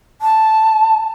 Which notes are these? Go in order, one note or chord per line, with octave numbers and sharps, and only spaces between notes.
A5